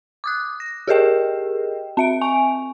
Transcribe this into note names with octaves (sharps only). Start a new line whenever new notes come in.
D6 D#6 F#6
A#6
G4 G#4 A#4 D#5 G5
C4 E5 D7
G#5 C#6